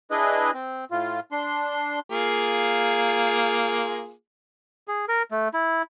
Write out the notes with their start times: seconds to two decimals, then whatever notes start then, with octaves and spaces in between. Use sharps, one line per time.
0.11 D4 E4 G#4 B4 D#5
0.54 C4
0.91 A2 F4
1.32 D4 C6
2.10 A#3 F4 G#4
4.88 G#4
5.08 A#4
5.31 A3
5.54 E4